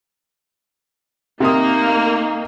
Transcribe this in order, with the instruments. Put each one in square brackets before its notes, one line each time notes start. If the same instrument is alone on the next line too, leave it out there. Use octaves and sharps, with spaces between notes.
[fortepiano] C3 D#6 [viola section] A#3 [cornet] D#4